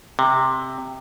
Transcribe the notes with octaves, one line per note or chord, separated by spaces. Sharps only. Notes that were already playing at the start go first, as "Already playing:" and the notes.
C3